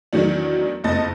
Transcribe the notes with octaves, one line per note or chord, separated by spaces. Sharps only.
E2 D#3 E3 F#3 A3 D4
F#1 F2 A3 D#5 A5 A6